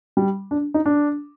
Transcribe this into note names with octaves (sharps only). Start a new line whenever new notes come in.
G3
D4
D#4
D4